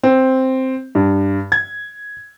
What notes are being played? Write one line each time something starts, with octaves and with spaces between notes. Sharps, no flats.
C4
G2
G#6